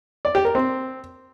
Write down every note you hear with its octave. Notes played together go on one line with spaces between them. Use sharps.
D5
G4
A#4
C4